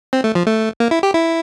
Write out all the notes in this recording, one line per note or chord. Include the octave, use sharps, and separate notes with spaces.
C4
A3
F3
A3
A#3
E4
G4
E4